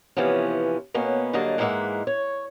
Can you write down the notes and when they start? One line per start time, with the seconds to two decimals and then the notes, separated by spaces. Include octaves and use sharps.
0.17 C3 E3 F3 B3 C#4
0.94 B2 A#3 B3 C#4
1.33 G2 D3 F#3 A#3 D#5 A5
1.58 G#2 E3 G#3 A#3 E5 F#5
2.07 C#5